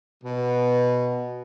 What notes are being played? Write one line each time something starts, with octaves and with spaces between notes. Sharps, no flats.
B2